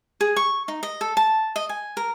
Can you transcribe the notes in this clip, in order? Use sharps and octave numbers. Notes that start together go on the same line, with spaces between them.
G#4
C#6
D#4
D#5
A4
A5
D#5
G#5
A#4